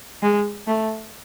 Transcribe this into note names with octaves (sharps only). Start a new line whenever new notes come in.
G#3
A3